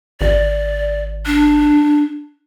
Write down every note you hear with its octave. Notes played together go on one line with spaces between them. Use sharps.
G#1 D5
D4